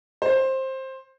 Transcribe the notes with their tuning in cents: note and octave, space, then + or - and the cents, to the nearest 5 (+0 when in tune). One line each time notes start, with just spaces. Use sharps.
C5 +15